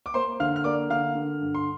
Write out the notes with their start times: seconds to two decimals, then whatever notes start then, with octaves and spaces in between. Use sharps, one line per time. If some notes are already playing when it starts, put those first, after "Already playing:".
0.06 D6
0.14 A#3 C5 C6
0.40 D3 F5 F6
0.56 F6
0.64 A#3 D5 D6
0.90 D3 F5 F6
1.15 D3
1.40 G2
1.54 C6